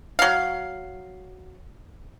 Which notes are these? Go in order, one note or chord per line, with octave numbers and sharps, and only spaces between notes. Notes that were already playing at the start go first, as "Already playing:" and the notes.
F#3 F5